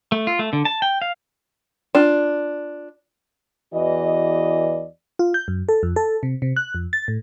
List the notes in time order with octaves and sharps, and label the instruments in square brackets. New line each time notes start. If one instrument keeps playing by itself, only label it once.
[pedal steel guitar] A3
F4
A3
D3
A5
G5
F5
[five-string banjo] D4 F4
[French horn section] E2 E3 F#4 D5 D#5
[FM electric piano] F4
G6
F#2
A4
F2
A4
C3
C3
F#6
F2
A6
A2